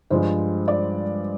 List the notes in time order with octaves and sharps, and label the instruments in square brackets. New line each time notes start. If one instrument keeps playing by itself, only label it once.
[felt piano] G2 F3 G#3 C5
D5